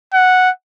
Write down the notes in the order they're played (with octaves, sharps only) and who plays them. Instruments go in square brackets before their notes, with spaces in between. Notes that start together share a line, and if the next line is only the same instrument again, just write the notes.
[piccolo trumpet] F#5